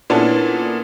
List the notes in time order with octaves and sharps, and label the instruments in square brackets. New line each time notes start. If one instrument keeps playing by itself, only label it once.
[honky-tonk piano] A#2 B3 C#4 D4 E4 A4